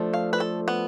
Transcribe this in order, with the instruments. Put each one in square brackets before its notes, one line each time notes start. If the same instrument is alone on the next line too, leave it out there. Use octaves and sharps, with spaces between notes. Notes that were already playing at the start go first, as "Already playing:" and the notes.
Already playing: [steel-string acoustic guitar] F3 A3 D4
[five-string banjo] F5
B4
A4
B3